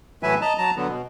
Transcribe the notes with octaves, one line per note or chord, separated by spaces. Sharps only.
A2 E3 F#3 B4 E5 G#5
D#5 A5 A#5
F#3 A5 A#5
D3 F#3 B3
B2